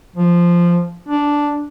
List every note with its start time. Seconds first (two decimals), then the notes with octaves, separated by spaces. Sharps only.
0.16 F3
1.09 D4